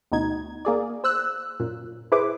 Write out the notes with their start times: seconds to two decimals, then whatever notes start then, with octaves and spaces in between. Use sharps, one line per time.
0.12 D2 B2 D#4 G#6
0.65 A#3 G#4 D5
1.04 C5 E6 F#6
1.60 F#2 A#2
2.12 E4 G#4 B4 C5 D6